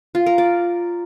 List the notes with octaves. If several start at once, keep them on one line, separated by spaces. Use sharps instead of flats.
F4
A#4
D5